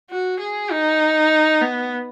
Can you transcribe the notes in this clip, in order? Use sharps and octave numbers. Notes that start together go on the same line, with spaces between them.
F#4
G#4
D#4
B3